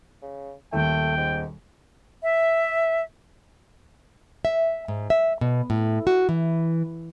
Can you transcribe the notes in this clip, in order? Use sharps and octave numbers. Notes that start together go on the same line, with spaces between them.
C#3
D#1 D#2 A3 G5
G#2
E5
E5
G#2
E5
B2
A2
F#4
E3